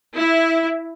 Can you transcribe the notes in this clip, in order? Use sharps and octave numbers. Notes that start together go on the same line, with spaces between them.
E4